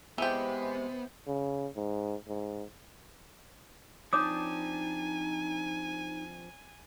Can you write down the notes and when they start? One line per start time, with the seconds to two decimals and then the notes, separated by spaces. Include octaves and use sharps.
0.18 C3 E3 G#3 B3 G4 C5
1.27 C#3
1.76 G#2
2.28 G#2
4.13 F3 C4 D4 D#4 C#5 G#5 D6 D#6